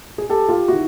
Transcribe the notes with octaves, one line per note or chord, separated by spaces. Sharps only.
G#4
G4 A4
F4 G4
D#3 E4 F#4